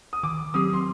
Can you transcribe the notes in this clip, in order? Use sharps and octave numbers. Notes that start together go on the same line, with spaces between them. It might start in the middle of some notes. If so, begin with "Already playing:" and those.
D#6
D#3 D6
F#3 C4 G4 D#6
C6